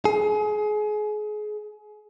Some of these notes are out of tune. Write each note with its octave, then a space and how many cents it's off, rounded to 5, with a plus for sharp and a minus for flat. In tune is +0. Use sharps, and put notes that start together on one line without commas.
G#4 +30